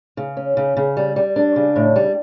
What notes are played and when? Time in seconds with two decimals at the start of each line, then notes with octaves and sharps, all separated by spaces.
0.17 C#3
0.37 C#4
0.57 C#3
0.77 C#3
0.97 G3
1.16 G3
1.36 D4
1.56 C#3
1.76 A2
1.96 G3